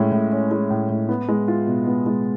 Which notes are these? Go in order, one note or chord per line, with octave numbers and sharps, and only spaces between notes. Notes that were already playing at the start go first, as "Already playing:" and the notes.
Already playing: A2 G#3 C#4
A2
C#4
G#3
A2
A2
B3
G#3
F4
B2
B3
G#3